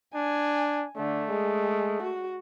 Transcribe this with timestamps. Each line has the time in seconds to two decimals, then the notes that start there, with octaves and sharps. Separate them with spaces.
0.15 D4 G#5
0.97 D3 A3
1.30 G#3
2.03 F#4